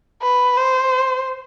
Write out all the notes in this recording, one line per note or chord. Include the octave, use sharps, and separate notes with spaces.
B4
C5